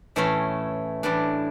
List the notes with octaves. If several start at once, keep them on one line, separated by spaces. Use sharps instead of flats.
A2 E3 A3 C#4
A2 E3 G3 D4